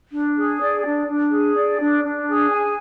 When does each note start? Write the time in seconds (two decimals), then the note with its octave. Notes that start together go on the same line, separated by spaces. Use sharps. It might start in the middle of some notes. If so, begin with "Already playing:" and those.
0.12 D4
0.36 G#4
0.61 D5
0.83 D4
1.07 D4
1.31 G#4
1.55 D5
1.79 D4
2.03 D4
2.27 G#4
2.50 G#5